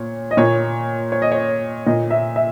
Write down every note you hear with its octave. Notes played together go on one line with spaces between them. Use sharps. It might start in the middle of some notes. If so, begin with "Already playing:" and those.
Already playing: A#2 C#5
D#5
A#2 C#5
C#5
D#5
C#5
A#2 D#5
E5
E5